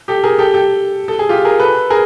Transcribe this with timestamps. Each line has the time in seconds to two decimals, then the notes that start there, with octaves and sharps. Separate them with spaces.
0.08 G4 A4
0.24 G#4 A#4
0.38 G4 A4
0.53 G4 A4
1.08 A4
1.19 G#4
1.29 F4 G4
1.45 G#4 A#4
1.60 A4 B4
1.90 G#4 A#4